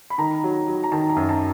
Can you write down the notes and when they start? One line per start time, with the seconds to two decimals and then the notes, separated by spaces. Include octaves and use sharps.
0.10 B5
0.18 D#3 A#5
0.44 F#3
0.68 F#3
0.84 A#5
0.92 D#3 A5
1.10 A#5
1.16 F#2
1.29 A5